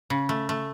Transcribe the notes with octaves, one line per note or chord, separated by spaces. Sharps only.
C#3
A3
A3